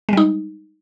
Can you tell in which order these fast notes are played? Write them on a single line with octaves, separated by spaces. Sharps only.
G#3 G3 D#4